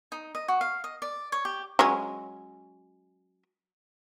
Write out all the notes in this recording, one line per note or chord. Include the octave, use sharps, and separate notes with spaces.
D#4
D#5
F#4
F5
D#5
D5
C#5
G4
F#3 G#3 C#4